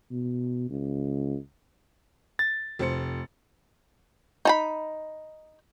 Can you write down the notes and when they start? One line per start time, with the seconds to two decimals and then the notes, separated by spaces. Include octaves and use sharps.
0.11 B2
0.70 C#2
2.39 A6
2.79 F1 C5 C#7
4.45 D#4 A5 B5